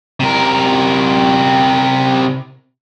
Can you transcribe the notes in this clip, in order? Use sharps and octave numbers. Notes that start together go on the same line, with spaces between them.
C3 A#4